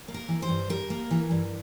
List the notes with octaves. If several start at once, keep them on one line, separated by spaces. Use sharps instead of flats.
A#3
A#4
E3
C5
G2
G3 A#4
A#3
E3
G2